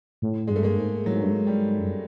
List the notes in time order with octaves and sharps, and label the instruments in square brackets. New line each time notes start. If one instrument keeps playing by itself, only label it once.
[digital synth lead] A2
[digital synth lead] G2 [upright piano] G#3
[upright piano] A3
G#3 A#3
[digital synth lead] G#2
[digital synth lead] A2 [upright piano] F#3
[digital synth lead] G#2
G2
G#2
[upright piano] G3
[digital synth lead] F#2